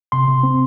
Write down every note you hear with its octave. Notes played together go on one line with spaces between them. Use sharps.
C3 C6
C3
C4